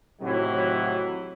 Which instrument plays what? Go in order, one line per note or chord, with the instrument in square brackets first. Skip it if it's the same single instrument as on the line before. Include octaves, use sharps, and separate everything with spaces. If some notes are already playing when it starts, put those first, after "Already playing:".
[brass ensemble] A2 C3 D#3 E3 F#3